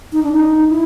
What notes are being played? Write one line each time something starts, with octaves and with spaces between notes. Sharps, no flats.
D#4
D4
D#4
E4